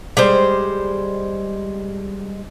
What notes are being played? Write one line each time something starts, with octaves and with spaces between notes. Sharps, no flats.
G3 G#3 C5